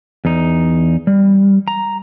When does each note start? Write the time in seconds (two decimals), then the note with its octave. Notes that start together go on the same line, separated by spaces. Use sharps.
0.25 E2 D#4
1.07 G3
1.68 A#5